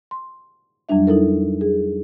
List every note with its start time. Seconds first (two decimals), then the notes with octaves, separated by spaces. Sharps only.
0.11 C6
0.89 F2 F#3 G3 D4 E5
1.07 D#4 E4 A4 A#4
1.61 G#4